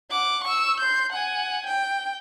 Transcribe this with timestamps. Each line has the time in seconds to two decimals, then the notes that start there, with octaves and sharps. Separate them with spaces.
0.11 F#5 D6
0.44 C#6 E6
0.80 C6 G6
1.12 F#5 G#5
1.66 G5